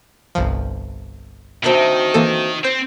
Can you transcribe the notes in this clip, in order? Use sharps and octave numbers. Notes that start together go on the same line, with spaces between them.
G1 C2 F3
D2 D#3 F#3 C4
E3 A#3 A4
C4 C5